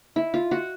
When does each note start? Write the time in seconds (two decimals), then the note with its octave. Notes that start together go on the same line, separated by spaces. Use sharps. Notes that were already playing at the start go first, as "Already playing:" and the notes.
0.16 E4
0.34 F4
0.51 F#4